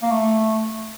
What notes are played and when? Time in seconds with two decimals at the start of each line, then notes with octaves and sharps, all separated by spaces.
0.03 A#3
0.11 A3